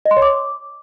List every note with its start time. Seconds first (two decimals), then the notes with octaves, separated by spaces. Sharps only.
0.05 D#5
0.11 C6
0.17 C#5
0.22 D6